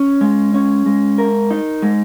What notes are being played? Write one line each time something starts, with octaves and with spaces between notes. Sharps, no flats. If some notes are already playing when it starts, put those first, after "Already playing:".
Already playing: C#4
G#3
C#4
G#3
A#4
D#4
G#3